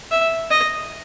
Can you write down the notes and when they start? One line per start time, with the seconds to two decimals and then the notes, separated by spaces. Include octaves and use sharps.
0.11 E5
0.50 D#5